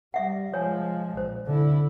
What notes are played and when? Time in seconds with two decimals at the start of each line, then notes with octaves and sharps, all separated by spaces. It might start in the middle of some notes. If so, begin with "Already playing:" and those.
0.14 G3 E5 F#5
0.54 F3 G#3 C#5 G#5
1.17 A#1 C5
1.46 D3 E4